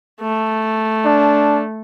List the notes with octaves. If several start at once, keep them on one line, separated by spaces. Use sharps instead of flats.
A3
D4